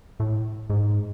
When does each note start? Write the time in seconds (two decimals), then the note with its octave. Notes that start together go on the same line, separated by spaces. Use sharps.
0.20 A2
0.70 G#2